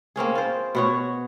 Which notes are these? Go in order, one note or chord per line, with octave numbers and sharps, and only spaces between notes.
A#3 C4 C#4 G#4
F4 C5
B2 F#4 C#5